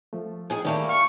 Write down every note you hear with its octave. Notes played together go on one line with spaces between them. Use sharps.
F3 A3
D#3 G#4 G#5
D#3 G3 A3 A#3
F5 C#6